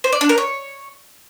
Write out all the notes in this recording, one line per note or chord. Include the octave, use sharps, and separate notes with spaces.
C5
D5
D4
A#4
C#5